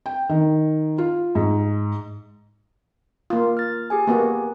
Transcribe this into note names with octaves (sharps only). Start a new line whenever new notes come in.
G5
D#3
F4
G#2
A#3 F4
F6 A6
G4 G#4 G#5
A#3 B3 F#4